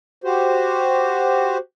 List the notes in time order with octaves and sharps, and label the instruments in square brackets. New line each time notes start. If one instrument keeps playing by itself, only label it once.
[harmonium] F#4 G4 C5